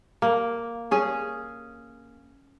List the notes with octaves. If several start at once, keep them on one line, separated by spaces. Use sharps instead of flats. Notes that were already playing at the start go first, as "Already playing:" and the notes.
A#3
C#4 G#4